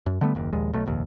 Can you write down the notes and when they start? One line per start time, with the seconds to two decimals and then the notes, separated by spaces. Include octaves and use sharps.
0.06 F#2
0.21 D3 G3 A3 B3
0.35 F#1 D#2
0.53 A#1 D#2 G#3
0.73 B1 A3
0.86 F1 A#1 D#2